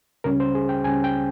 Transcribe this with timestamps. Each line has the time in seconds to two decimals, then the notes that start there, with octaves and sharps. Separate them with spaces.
0.24 C#2 C#3 G3 C#4 A#4
0.40 C5
0.55 G#4
0.69 G5
0.84 C#2 C#3 G3 C#4 G#5
1.04 G5